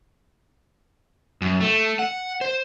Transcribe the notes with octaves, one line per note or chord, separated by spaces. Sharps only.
F#2
A3
F#5
C5